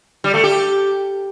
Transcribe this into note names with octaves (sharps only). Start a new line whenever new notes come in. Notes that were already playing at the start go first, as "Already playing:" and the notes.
G3
A3
G4